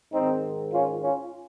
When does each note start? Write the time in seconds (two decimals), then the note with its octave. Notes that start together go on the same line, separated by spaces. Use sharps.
0.12 G#2 D#3 C4 D#4
0.72 C#4 F4
1.03 C#4 F4